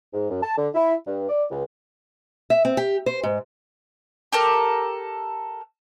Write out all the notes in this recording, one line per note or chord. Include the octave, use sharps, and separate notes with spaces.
G#2
F#2
A5
D3
E4
G2
D5
C#2
E5
C4
G4
C5
G#2
G4 A4 A#4